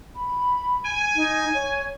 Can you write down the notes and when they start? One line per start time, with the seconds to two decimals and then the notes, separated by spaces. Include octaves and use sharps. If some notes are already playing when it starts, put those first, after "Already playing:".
0.15 B5
0.85 G#5
1.16 D#4
1.54 C#5